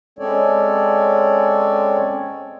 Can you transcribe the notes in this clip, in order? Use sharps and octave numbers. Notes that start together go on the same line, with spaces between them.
G#3 C4 C#4 A4 C#5 D5